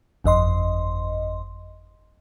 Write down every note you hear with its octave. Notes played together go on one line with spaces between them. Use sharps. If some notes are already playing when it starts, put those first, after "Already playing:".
G1 F2 D#5 C6